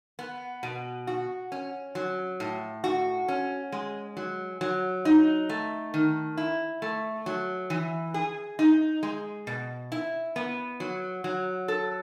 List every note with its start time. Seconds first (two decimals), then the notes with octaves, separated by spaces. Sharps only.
0.19 B3
0.63 B2
1.07 F#4
1.52 C#4
1.95 F#3
2.40 A2
2.84 F#4
3.28 C#4
3.72 G#3
4.17 F#3
4.61 F#3
5.05 D#4
5.49 A3
5.94 D#3
6.37 E4
6.82 A3
7.26 F#3
7.70 E3
8.14 G#4
8.59 D#4
9.03 G#3
9.47 B2
9.92 E4
10.36 B3
10.80 F#3
11.24 F#3
11.68 A4